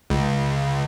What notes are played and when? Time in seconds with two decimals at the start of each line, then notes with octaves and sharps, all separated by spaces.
0.10 C#2